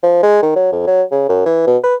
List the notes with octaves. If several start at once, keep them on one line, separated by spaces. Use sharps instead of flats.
F3
G#3
D#3
F#3
F2
F#3
C#3
F#2
E3
B2
B4